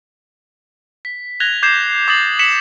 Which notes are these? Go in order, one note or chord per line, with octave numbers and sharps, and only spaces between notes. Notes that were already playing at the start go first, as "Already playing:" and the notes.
B6
F#6 G#6 A#6 F7 G7
D6 G6 G#6 C7 E7
D6 D#6 A6 C7 F#7
B6 C#7 E7 F#7